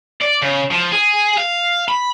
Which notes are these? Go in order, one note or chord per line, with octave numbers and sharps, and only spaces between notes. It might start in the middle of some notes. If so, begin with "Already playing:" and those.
D5
C#3
F3
G#4
F5
B5